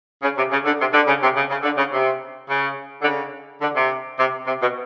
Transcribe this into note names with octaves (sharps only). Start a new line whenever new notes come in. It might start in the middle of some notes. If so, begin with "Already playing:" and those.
C#3
C3
C#3
D3
C3
D3
C#3
C3
C#3
C#3
D3
C#3
C3
C#3
D3
C#3
D3
C3
C3
C3
B2